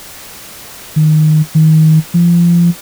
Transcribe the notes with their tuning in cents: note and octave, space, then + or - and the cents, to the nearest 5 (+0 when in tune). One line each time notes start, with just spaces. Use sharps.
D#3 -10
D#3 +20
F3 -25